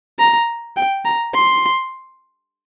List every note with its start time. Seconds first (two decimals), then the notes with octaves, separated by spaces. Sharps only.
0.19 A#5
0.77 G5
1.05 A#5
1.35 C6